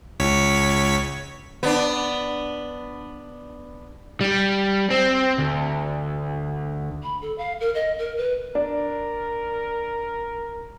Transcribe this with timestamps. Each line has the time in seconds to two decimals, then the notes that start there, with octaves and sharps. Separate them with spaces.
0.20 C#2 C#5 B6
1.63 B3 D4
4.21 G3
4.91 C4
5.38 D2
7.03 B5
7.22 A4
7.38 F5
7.60 A#4
7.75 D#5
7.98 A#4
8.17 B4
8.55 D4 A#4